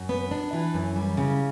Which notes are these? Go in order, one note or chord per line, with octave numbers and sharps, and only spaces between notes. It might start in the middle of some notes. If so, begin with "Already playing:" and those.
Already playing: F#2
B3
D4
E3
F#2
G3
C#3